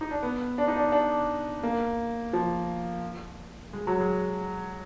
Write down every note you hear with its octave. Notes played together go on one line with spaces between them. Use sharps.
D#4
D4
B3
D4
D#4
D4
D4
A#3
F3
G#3
F#3
G#3